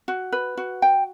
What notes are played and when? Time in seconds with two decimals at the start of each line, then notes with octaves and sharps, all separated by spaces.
0.08 F#4
0.32 B4
0.57 F#4
0.82 G5